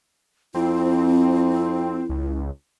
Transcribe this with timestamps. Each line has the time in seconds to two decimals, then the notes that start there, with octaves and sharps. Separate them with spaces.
0.54 F2 C4 E4
2.09 C#2